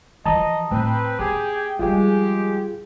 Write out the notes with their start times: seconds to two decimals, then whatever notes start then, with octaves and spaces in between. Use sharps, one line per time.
0.26 E3 F3 D#5 A5 A#5 D#6
0.71 A2 C4 B4 G5
1.19 B3 G4 G#4
1.79 F3 G3 G#3 F4 G4 G#4